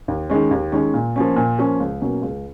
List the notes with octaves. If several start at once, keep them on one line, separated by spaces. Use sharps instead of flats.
D#2
D#3 G#3 C#4
D#2
D#3 G#3 C#4
A#2
F3 A#3 C#4
A#2
F3 A#3 C#4
C#2
B2 F#3 A#3 C#4
C#2